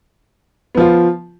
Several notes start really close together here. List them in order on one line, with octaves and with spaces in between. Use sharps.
B3 F3 F4